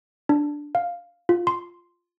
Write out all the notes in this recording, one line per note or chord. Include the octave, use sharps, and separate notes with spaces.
D4
F5
F4
C6